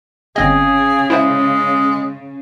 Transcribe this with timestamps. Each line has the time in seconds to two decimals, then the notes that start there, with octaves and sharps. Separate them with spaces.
0.36 G1 C#3 C4 G#4 D#5
1.10 G#3 E4 C5 E5